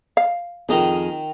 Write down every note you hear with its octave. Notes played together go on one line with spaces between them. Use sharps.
F5
F2 D#3 G#4 D#5 A#5